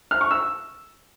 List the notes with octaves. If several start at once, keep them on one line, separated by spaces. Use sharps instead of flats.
F6
C#6
E6